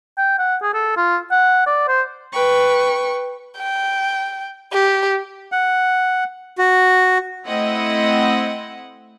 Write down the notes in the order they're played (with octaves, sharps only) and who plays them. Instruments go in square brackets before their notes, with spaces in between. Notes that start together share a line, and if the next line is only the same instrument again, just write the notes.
[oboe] G5
F#5
G#4
A4
F4
F#5
D5
C5
[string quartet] B4 G5 C#6
[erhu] G5
G4
[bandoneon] F#5
[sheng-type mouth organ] F#4
[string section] A3 C4 E4 D#5 F#5